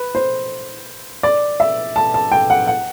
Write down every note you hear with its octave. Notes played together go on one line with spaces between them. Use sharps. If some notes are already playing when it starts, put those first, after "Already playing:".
Already playing: B4
C5
D5
E5
A5
A5
G5
F#5
F#5